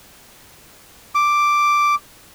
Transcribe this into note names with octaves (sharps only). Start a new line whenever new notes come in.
D6